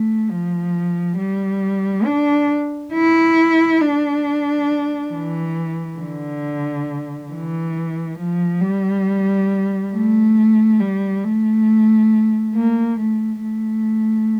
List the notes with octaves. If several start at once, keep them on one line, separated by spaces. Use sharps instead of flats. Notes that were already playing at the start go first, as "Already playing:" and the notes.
Already playing: A3
F3
G3
D4
E4
D4
E3
D3
E3
F3
G3
A3
G3
A3
A#3
A3
A3